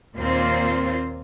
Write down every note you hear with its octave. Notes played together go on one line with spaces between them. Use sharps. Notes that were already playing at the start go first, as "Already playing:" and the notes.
D#2 A#2 A#3 C4 F4 C5